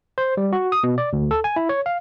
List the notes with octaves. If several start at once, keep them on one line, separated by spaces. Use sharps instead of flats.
C5
G3
F#4
D#6
B2
D5
D2
A4
G#5
E4
C#5
F5